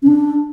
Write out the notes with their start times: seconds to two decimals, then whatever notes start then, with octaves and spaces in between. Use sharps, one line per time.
0.02 C#4
0.07 D4